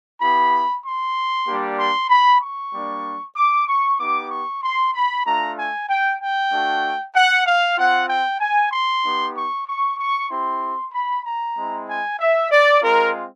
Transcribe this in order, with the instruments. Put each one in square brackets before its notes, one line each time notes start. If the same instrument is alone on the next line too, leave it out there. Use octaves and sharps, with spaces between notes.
[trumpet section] B3 E4 G4 B5
C6
G3 A#3 D4 G4
C6
B5
C#6
G3 A#3 D4
D6
C#6
B3 D#4 G4 D6
C#6
C6
B5
A3 D4 F4 A#5
G#5
G5
G5
A3 D4 F#4
F#5
F5
C4 F4 F#5
G5
G#5
C6
B3 D#4 G4
C#6
C#6
C#6
C4 E4 G4 C6
B5
A#5
G#3 C4 E4
G#5
E5
D5
G#3 C4 F4 A#4